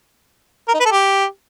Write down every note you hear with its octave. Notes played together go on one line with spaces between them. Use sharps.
A#4
D#4
B4
A4
G4